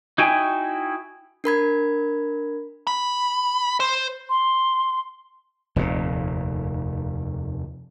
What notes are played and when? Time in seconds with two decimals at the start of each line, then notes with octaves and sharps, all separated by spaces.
0.18 D#4 E4 F#4 G5 G#5
1.44 D4 A#4 B5 G#6
2.87 B5
3.80 C5
4.29 C6
5.76 F1 D#2 A#2